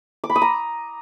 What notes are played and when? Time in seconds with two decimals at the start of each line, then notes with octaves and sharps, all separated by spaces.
0.24 D6
0.30 B5
0.36 D#6
0.42 A#5